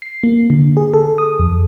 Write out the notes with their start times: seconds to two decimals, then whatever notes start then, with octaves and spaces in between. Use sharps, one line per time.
0.02 C7
0.23 A#3
0.50 D3
0.77 G#4
0.94 A4
1.18 D#6
1.39 F2